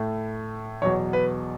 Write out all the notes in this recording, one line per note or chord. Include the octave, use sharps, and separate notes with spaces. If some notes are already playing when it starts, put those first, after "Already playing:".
Already playing: A2 A3
E2 B2 F#3 C#5
B4